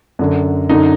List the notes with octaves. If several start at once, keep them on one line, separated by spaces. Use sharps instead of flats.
F#2 D3
F#2 D3 D#4